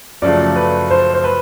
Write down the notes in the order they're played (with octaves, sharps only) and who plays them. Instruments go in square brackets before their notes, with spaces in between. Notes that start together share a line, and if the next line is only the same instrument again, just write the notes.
[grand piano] F#2 C#3 F3 A3 D5
B4
C5
C5
B4